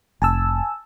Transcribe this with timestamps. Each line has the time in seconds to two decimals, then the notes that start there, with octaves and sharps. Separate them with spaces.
0.22 F1 G#5 A5 E6